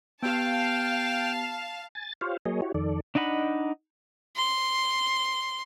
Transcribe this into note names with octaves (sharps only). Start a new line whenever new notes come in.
B3 G4 F5 G5 A5
G#5 A6
F4 G4 C5 C#5 F5
F#3 A#3 G#4 C#5 D#5
E4 F#4 G4 C#5
F2 D#3 A4 D5
D4 D#4 D#5 F#5 B5
C6